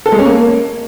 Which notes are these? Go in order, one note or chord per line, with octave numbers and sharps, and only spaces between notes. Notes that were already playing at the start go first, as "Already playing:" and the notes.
A4
G#3
C#4
A#3